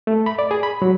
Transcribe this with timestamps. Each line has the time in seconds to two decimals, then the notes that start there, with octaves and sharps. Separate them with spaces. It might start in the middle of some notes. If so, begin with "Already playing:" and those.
0.07 A3
0.26 B5
0.39 D5
0.51 G#4
0.63 B5
0.82 F#3